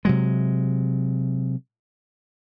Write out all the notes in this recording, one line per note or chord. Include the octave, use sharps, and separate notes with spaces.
C3 F#3 G#3